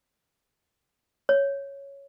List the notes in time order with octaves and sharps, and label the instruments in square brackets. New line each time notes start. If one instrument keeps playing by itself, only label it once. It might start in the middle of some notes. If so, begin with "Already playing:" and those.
[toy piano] C#5